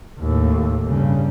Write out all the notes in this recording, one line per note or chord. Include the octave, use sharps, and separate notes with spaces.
D#2 A2
G2 C#3